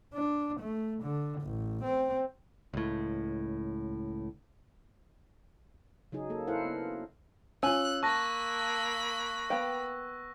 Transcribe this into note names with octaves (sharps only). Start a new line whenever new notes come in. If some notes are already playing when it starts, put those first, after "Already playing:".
D4
A3
D3
A1
C4
C#2 A2
C#3 F#3 D#4 G#4
A#3 A4
E4 A4 A#4 C5 F5 F#5
B3
C#4 F4 G#5 E6 F#6
A#3 A5 B5 C#6 F#6 A#6
B3 F5 G5